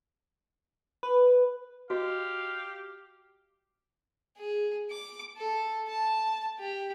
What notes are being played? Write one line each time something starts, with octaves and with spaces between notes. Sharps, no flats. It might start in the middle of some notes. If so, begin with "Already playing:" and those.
B4
F#4 G4 D#5 F5
G#4
D6
A4
A5
G4